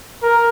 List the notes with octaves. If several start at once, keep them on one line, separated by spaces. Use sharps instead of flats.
A#4